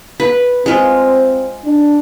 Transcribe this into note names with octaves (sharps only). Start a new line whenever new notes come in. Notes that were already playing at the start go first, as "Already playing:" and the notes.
B4
G#3 C4 F4
D4